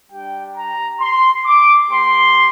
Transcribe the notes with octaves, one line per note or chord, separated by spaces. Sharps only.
G3 D4 G4 G5
A#5
C6
D6
A#3 G4 C6